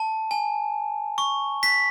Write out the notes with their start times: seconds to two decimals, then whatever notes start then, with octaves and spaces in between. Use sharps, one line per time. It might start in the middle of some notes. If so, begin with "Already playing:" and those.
Already playing: A5
0.31 G#5
1.18 C#6
1.63 B6